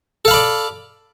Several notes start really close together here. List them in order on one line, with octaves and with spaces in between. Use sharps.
A4 F5 B5 D5